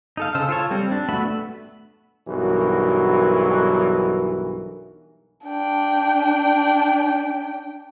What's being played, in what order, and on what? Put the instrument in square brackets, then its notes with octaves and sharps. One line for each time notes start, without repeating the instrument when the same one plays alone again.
[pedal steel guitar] D#4 A4 F5
C#3 C5 A5 E6
F4 A4 C#5
G3 C4
D4
A3 B3 F#4 E5 B5
[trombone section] B1 G2 E3 F#4 A#4
[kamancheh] D4 G5